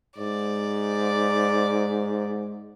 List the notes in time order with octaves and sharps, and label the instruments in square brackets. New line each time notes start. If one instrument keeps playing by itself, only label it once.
[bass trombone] G#2 [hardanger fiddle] D5